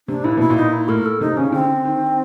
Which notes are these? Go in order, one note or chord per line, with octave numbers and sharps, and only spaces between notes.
C3 D4
A#2 E4
B2 E4
A#2
D#4
E4
A2 A#4
A4
C3 D#4
C#3 C#4
D3 C4
D#3